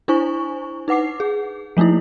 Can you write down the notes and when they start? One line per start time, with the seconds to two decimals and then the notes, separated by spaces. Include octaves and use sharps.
0.08 D4 E4 C5 G#5 C#6
0.88 D#4 B4 F#5 D6 C7
1.20 G#4
1.77 F3 A3 A#3 D#4 E4